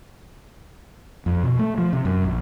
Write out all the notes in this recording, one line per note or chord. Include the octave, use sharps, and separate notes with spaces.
F2
B2
A3
F3
C3
F#2
A#1